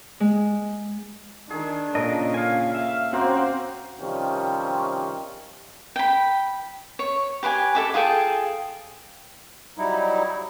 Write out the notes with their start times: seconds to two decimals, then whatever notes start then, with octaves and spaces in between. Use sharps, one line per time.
0.20 G#3
1.50 D#3 D4 G#4
1.95 A#2 C#3 C#4 A4 A#4 D#5
2.34 F5 G#5
2.75 E5 F5
3.13 A#3 C4 C#4 F#4 C5
4.01 C3 D#3 F3 G3 C4 C#4
5.96 G5 B5
6.99 C#5
7.43 G4 B4 D5 G#5
7.75 A4 E5 D6
7.94 F4 G#4 A4 G5
9.78 F#3 G3 D#4 E4